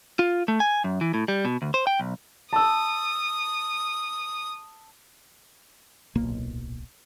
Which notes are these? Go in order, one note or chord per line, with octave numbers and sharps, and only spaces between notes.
F4
A3
G#5
F#2
E3
A2
G3
B2
D2
C5
G5
B1
A5 D#6 E6
D1 B1 A#2 A#3